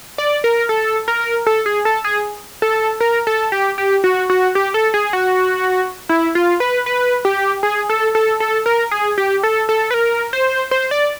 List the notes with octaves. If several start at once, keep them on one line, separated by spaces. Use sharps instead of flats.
D5
A#4
A4
A#4
A4
G#4
A4
G#4
A4
A#4
A4
G4
G4
F#4
F#4
G4
A4
G#4
F#4
E4
F4
B4
B4
G4
G#4
A4
A4
A4
A#4
G#4
G4
A4
A4
B4
A#4
C5
C5
D5